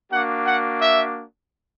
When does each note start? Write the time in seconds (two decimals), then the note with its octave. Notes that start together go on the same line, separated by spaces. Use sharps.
0.10 A#3 D4 F#4 F#5
0.46 F#5
0.81 E5